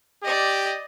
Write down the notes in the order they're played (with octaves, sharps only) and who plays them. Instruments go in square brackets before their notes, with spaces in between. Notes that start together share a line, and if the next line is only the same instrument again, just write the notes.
[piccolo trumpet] G4 [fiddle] D5 D#5